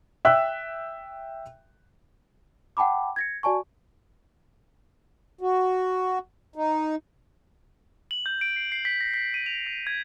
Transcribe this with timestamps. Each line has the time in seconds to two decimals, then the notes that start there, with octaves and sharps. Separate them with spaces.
0.25 E5 G5 E6 F#6
2.77 F#5 G5 A5 B5 D6
3.16 G#6 A#6 C#7
3.43 F#4 D5 G#5 A5 C#6
5.41 F#4
6.56 D#4
8.11 F#7
8.26 G6
8.41 D7
8.56 C7
8.72 C7
8.85 B6
9.01 A#6
9.14 B6
9.34 D#7
9.46 F7
9.67 A#6
9.87 G#6